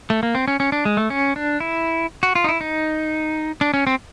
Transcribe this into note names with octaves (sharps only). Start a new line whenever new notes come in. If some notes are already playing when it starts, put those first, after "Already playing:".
A3
A#3
C4
C#4
C#4
D4
G#3
A3
C#4
D4
E4
F#4
F4
D#4
E4
D#4
D4
C#4
C4